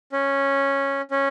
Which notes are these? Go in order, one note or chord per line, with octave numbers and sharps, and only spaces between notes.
C#4
C#4